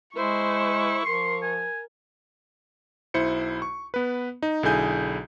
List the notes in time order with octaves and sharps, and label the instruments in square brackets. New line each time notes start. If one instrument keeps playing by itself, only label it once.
[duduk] G#3 [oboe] E4 [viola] C5 [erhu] C#6
[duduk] F3 [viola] A#4 [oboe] C6
[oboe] G#5
[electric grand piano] B1 E4 C5 C#7
C#6
B3 B4
D#4
B1 D3 E4 G#4 G#5 G6